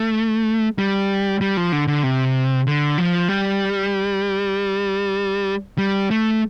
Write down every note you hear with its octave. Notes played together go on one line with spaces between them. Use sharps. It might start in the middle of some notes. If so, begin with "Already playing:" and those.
Already playing: A3
G3
G3
F3
D3
D3
C3
D3
F3
G3
G3
A3